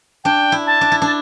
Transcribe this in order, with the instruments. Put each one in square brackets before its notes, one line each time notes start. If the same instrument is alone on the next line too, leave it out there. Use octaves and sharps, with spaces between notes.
[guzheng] D4 [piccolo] G5
[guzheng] E4
[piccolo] A5
[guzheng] D4
E4
[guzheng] D4 [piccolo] A5